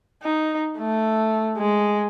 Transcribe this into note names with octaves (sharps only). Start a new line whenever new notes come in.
D#4
A3
G#3